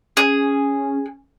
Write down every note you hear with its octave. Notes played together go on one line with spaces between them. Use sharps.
C#4 G#4